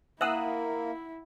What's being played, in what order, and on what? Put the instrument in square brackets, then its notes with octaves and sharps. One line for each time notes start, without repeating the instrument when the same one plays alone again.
[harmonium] A#3 [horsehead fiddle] E4 [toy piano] E5 F#5 [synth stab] D#6 E6 F#6